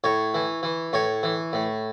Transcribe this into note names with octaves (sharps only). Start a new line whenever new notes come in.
A2 C#5
E3
E3
A2 C#5
E3
A2